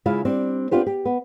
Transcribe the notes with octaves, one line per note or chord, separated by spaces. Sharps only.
C#3 G#3 E4 F4 F5
G3 C4 D4
B3 C4 D4 F4 G4 C5
G4
B3